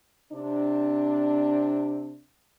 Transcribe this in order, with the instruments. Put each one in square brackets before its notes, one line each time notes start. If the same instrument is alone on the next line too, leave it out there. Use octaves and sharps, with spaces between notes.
[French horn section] C3 C4 D4